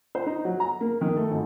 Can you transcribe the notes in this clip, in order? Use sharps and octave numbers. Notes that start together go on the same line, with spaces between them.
C5
D#4
F#3
A#5
A#3
D#3
A3
G#1